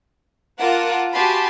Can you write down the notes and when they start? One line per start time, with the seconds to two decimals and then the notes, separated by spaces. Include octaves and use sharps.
0.60 F4 A#4 F#5 A5 D6
1.13 F#4 G4 G#5 A5 B5 C6